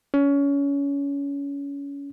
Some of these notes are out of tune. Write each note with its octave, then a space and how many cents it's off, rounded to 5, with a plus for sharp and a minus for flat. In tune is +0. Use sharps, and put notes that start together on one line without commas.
C#4 +25